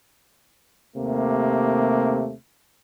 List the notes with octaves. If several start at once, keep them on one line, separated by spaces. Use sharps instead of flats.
D#2 C3 A3 A#3